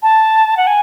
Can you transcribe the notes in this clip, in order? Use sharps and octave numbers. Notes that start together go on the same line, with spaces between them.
A5
F#5
G#5